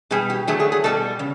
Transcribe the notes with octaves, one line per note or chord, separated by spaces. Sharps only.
B2 G3 G#4
G4
D3 F#3 A3 G#4
G#4
G#4
B2 G3 A4
C#3